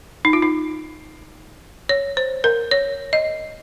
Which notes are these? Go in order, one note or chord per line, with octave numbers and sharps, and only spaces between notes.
D#4
F4
D#4
C#5
C5
A#4
C#5
D#5